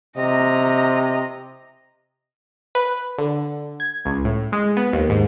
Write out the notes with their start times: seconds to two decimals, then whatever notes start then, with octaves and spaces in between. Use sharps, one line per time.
0.17 C3 D#5 A#5
2.75 B4
3.18 D3
3.80 G#6
4.05 C#2
4.25 A2
4.52 G#3
4.77 B3
4.93 D#2
5.10 G#2